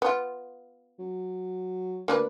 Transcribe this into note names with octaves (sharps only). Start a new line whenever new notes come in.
B3 F4
F#3
D2 A#3 D4 B4